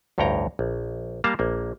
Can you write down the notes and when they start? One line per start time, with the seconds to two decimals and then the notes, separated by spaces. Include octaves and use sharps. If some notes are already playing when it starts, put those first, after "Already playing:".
0.18 A1 D2 G2 C#5 G5 A#5
0.59 A#1
1.24 G3 A#3 F5 A5 A#5
1.39 A#1 A#3